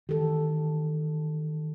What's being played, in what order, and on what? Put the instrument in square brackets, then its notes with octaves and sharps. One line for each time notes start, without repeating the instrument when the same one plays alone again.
[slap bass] D#3 E3 [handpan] G4 A4